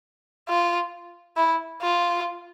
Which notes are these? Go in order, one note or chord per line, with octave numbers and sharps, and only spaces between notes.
F4
E4
F4